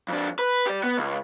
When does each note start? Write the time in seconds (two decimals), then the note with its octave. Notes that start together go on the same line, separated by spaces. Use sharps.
0.09 F2 D4
0.39 B4
0.66 G4 D5
0.84 B3
0.98 C#2